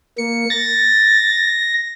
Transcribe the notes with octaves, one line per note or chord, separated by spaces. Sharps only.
A#3 C#7
A6 A#6